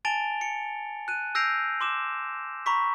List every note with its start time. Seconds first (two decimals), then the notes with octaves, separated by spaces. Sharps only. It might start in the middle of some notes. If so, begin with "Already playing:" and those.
0.05 G#5 A5 A6 D7 F7 G7
0.41 C#7
1.08 F#6 D#7
1.35 E6 G6 A#6 C7 D7 F7
1.81 C6 D6 E7
2.66 A#5 B5 C#6 B6